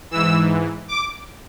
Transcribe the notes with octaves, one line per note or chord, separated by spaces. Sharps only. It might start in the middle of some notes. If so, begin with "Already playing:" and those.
G#2 E3 E6
D6